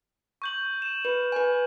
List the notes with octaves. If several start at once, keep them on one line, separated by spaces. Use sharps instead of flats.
C#6 G6 F#7
D#7 E7
B4
B4 G#5